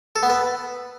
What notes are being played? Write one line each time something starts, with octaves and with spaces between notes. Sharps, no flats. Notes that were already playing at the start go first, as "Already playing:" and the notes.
A4
B3
B4